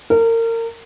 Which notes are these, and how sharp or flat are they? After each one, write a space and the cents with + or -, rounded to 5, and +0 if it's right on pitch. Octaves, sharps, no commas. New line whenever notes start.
A#4 -30